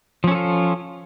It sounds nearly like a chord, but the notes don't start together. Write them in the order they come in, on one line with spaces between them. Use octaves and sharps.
F3 C#4 A4 F4